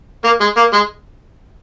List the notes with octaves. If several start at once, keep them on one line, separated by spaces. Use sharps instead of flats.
A#3
G#3
A#3
G#3